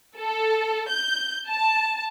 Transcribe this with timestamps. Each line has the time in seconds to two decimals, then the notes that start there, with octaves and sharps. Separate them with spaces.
0.17 A4
0.90 G6
1.48 A5